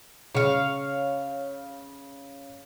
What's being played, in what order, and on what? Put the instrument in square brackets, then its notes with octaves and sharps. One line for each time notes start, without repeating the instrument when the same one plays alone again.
[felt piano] C#3 [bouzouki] C#5 F5